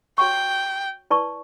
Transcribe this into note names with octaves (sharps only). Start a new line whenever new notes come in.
F#4 C#5 F#5 G5 C#6
E4 B4 D5 A5 C#6